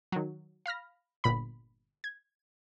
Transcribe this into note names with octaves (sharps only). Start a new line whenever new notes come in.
D#3 F#3
F5 B5 F6 A#6
G1 A#2 B5
G#6